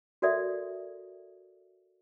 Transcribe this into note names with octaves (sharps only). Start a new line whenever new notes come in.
F#4 A4 A#4 D5 E5 D#6